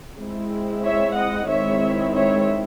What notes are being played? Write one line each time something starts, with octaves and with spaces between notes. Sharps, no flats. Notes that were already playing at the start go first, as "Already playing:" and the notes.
G#3 C4 E4
C#5 E5
D#5 F#5
D#3 G#3 C4 E4 C#5 E5
C#5 E5